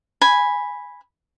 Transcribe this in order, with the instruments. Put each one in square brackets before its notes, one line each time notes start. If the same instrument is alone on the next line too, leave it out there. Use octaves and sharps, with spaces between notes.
[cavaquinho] G#5 B5